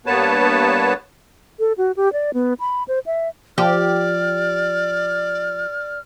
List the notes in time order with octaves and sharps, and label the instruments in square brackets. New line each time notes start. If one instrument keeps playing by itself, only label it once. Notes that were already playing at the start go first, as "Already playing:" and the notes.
[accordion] G2 A#3 B3 B4 C#5 A5
[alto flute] A4
F#4
G4
D5
B3
B5
C5
E5
[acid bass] F3 [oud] G4 [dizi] D5 [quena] F6